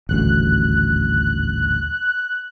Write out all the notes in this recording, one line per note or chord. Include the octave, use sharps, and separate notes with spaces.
D#1 A1 D2 F#6